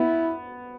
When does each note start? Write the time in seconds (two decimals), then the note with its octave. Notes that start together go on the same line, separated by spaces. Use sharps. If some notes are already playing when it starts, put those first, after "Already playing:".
Already playing: B3 E4